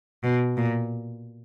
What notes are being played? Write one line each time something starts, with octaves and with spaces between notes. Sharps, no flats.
B2
A#2